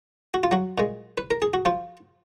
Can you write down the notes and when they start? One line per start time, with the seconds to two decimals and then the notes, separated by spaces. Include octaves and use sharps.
0.34 F#4
0.43 F4
0.51 F#3 F#4
0.78 A#2 G#3
1.18 B4
1.31 A#4
1.42 G#4
1.54 F#4
1.65 F3 F4